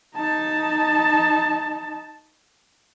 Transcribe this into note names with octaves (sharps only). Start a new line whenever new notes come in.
D#4 A5